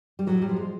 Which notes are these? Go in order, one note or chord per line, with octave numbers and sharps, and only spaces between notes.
G3
A2 F#3
G3
F3
G#3